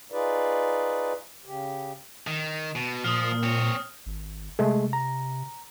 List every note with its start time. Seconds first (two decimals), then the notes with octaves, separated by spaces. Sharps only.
0.12 D#4 F4 G#4 B4 D5
1.46 C#3 G4
2.27 D#3
2.76 B2
3.04 A#2 F3 D#6 F6
3.43 C4 C#5
4.06 G#1
4.59 C3 G#3 A3 G#4
4.93 A#5